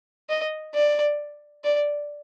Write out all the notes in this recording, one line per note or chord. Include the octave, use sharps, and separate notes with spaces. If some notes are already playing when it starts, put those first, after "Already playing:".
D#5
D5
D5